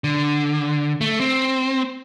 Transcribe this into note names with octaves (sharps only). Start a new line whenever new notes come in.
D3
A3
C4